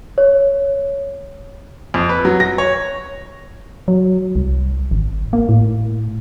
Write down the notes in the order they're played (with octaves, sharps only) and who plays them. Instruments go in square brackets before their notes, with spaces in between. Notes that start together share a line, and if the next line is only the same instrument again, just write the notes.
[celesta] C#5
[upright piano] F2
B4
F#3
A#6
C#5
[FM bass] F#3
C2
G#1
A#3
A2